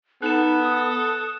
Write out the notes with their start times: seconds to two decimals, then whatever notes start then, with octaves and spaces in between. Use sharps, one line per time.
0.22 B3 D#4 A4 F#6 E7
0.60 D#6